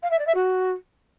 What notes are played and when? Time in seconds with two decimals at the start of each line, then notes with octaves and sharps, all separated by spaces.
0.02 F5
0.10 E5
0.18 D5
0.26 E5
0.34 F#4